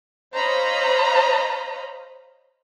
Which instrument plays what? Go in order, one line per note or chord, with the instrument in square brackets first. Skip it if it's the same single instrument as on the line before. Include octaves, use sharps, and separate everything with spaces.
[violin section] C5 C#5 D#5 F5 A#5 B5